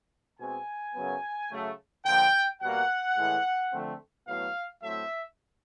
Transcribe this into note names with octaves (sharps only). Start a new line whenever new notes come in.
B2 G#3 C4 G#5
F#2 C#3 F#3 B3
C#3 F#3 A3
D3 F3 A#3 G5
B2 G3 A#3 F#5
A2 E3 G#3
D3 F3 A3 C4
A2 F#3 B3 F5
A2 F#3 A3 C4 E5